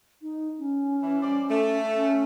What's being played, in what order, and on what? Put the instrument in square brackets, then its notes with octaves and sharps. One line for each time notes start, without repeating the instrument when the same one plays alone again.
[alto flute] D#4
C#4
[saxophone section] E3
G3 C5 D5
A3
[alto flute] C#4